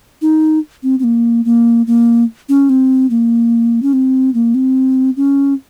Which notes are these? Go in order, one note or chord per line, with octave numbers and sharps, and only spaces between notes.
D#4
C4
C4
A#3
A#3
A#3
C#4
C4
A#3
C#4
C4
A#3
C4
C#4